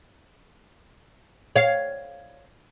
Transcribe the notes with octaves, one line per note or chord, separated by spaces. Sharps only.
C#5 F5